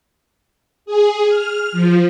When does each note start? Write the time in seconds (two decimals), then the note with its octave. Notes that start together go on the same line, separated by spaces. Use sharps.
0.86 G#4
1.28 F6
1.72 F3